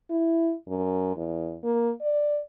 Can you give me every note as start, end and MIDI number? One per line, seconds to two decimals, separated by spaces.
0.10 0.53 64
0.68 1.13 42
1.16 1.57 40
1.64 1.91 58
2.01 2.39 74